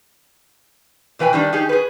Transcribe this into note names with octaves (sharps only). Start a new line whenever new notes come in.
B2 E3 B4 G5 G#5
D#3 G3 D4
D#4 G4 G#4
G#4 B4